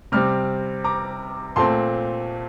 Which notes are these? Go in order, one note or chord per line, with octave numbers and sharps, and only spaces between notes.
C3 G3 C4 D6 F6
A#5 D6
A#2 A3 C4 A5 C6